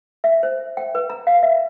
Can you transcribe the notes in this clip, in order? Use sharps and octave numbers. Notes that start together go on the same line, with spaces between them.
E5
C5
G5
B4
A#5
F5
E5